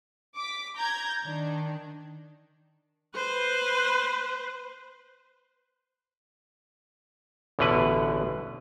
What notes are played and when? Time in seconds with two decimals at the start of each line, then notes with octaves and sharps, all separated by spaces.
0.38 D6 B6
0.77 A#5 G6 G#6
1.25 D#3 D4
3.15 B4 C5
7.59 A1 E2 B2 D3 B4